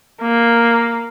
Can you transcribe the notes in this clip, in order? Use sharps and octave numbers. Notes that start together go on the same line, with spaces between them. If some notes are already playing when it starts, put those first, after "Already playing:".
A#3